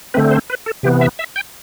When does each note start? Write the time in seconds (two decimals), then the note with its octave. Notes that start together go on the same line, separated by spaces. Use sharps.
0.14 D3 A3 C4 B4
0.31 C5
0.50 B4
0.66 A4
0.83 C3 E3 B3 G4
1.01 E5
1.19 E5
1.36 G5